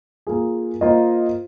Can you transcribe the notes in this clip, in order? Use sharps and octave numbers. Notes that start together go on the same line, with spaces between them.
A#3 F4 G#4
A#3 F4 C5 D#5